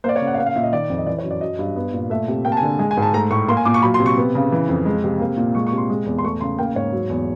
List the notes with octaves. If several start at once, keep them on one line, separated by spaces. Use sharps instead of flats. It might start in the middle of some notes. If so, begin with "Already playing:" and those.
A#3 C5 D5
C#5
C#3
F#5
F5
A#3 F#5
F5
A#2 E5
D#5
D#3 D5
F2
D#5
E3 D5
C#5
F#2
D5
F#3 D#5
G2
B3
A#2
A3 E5
C3
A#3 G5
A5
G#5
D3
G#3 G#5
G#5
G#2
A5
A3 A#5
A2 C#6
A#3 C6
G#5
A#2 D6
C#6
F#3 B5
C6
C3
C#6
B3
C#3
E3
F2
G#3
C3
A#3
A#2
G#3 C#6
C#6
C3
C6
G#3
E2
C6
A3 C#6
C#3 C6
A#3 G5
G#2 C#5
F#3
E2